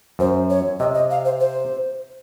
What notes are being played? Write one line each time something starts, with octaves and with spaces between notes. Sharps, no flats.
F#2 C5
C#5
C3 D#5
D#5
F5
C5
C5